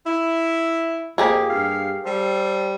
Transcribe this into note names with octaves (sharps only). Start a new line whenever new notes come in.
E4
F2 A#3 G4 G#4
G2 F5
G3 A4 C5